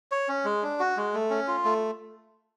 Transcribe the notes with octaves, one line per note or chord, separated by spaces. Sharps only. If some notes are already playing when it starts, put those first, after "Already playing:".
C#5
C#4
G#3
D4
F#4
G#3
A3
C#4
F4
A3